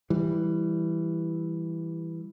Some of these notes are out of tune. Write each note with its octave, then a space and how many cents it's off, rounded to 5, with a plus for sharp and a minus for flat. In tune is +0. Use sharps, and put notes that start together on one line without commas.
E3 +0 G3 +0